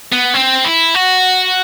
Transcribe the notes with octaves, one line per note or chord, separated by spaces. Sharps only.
B3
C4
E4
F#4